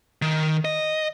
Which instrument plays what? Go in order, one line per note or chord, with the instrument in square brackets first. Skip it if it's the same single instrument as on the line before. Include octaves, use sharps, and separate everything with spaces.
[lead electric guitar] D#3
D#5